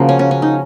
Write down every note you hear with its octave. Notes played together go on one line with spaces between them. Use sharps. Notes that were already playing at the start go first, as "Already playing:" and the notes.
Already playing: C#3 F3 A#3 F#4
C#4
C#4
C#4
D#4